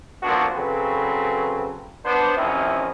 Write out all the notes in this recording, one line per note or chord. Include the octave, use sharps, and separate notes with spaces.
C2 A#2 F3 B3 D4 F#4
C#3 F#3 C4 A4 B4
B3 D4 C5
A1 C3 D#3 F3 C#4 E4